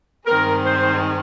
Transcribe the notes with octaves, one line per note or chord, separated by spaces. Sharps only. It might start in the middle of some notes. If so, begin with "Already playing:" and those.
G2 D#3 G#3 C4 A#4
C5